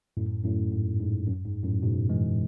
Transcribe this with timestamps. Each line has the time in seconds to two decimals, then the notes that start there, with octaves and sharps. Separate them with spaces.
0.17 F#2 A2
0.44 F#2 A2
0.72 G#2
0.99 G#2
1.27 F#2
1.45 G#2
1.63 F#2 A2
1.82 G#2 B2
2.09 E3 G#3